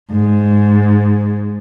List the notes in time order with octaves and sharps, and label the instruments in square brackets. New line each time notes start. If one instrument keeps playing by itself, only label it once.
[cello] G#2